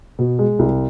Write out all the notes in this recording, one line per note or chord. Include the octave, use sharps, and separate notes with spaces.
B2
G#3
C2